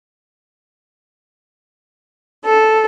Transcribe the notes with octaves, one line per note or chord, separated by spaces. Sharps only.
A4